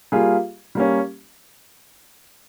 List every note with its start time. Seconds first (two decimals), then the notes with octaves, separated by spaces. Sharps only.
0.12 G3 A#3 F4 G#4
0.75 G3 A#3 C#4